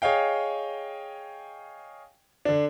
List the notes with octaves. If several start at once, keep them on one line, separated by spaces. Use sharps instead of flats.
G#4 C#5 D#5 F5 G5
D3 D4